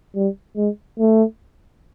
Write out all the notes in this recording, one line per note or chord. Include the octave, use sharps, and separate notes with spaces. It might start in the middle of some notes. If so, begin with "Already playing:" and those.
G3
G#3
A3